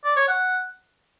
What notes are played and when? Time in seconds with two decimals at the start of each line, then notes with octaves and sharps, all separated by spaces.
0.04 D5
0.16 C#5
0.28 F#5